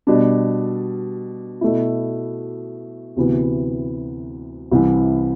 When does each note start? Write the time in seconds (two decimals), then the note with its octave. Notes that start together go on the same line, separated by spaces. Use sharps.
0.07 B2 G3 D4
1.61 B2 A3 E4
3.16 D2 C3 E3 B3
4.72 C2 C3 E3